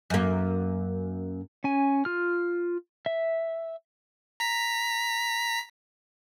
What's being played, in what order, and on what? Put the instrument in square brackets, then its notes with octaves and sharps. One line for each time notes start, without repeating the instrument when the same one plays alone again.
[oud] F#2 A#3
[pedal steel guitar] C#4 G#5
F4 F6
E5
[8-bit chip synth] A#5 B6